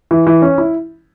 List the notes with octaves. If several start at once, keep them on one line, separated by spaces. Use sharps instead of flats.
E3
E3
C#4
E4